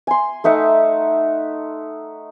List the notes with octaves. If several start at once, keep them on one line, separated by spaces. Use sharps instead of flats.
G#5 C6
A3 D#4 E5 F#5